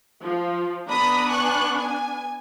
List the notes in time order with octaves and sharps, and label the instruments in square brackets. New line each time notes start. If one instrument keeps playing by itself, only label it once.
[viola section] F3
[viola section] B3 D4 [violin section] A#5 B5 D#6
[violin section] G#5 C#6 F#6
G#5